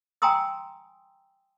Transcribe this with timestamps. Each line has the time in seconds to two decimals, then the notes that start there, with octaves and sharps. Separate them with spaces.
0.22 G5 G#5 A#5 C6 D#6 E6